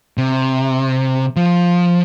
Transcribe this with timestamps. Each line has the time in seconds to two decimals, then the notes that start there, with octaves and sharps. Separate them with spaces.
0.18 C3
1.36 F3